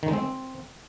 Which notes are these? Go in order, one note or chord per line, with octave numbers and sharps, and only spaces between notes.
D#3
G#3
C4